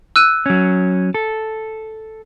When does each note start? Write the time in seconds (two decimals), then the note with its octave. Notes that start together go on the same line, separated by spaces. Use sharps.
0.16 E6 F#6 D#7
0.46 F#3 C#4
1.14 A4